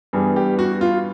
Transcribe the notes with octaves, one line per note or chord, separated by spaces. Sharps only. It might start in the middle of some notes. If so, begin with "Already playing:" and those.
G2 E3 G3 B3 G#4
G4
F#4
F4